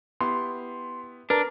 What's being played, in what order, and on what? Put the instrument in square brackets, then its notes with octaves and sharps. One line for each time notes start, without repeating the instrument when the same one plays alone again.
[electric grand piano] B3 E4 G4 [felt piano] C6
[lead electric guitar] D4 [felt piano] A#4 [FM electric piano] B4